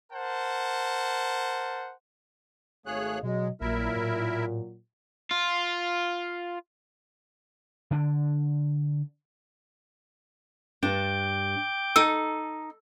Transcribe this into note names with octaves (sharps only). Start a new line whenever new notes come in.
A#4 C5 F#5 A5
G#1 A3 G#4 C#5 F5 F#6
B2 F#3 G#3 D#5
A#1 A#2 F#3 E4 A#4 E5
A2
F4
D3 D4
G2 D4 G5 D6 G6
D#4 A4 E6